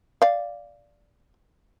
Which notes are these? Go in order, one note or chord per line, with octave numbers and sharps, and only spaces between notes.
D5 F5